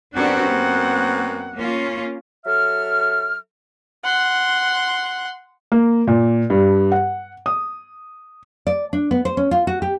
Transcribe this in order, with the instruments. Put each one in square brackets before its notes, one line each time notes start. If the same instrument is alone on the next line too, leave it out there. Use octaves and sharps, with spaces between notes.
[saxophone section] F#2 B3 C4 [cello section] D4 F#4 G4 [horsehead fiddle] F#5
[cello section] A#3
A#3 C#4 F4
[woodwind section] F#3 A4 E5 F6
[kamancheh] F#5 C6
[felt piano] A#3
A#2
G2
F#5
D#6
[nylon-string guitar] D5
D4
B3
C5
C#4
F4
F#4
G4